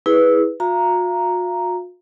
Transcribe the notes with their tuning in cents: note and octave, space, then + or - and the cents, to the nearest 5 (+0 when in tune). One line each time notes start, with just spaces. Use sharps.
E4 -20 G#4 +0 B4 +0
F#4 -45 F5 -35 A#5 +0